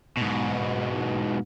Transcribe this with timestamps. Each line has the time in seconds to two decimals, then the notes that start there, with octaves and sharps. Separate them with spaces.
0.17 G#2 B2